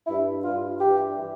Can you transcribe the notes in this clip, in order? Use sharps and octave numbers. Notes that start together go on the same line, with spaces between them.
G2 E4
G2 F4
E3 G4
E3